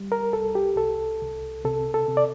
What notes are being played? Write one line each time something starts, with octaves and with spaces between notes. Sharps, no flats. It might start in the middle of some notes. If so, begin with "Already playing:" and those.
Already playing: G3
A#4
C2 A4
G4
C2 A4
C2
C3 A4
A4
C3
D5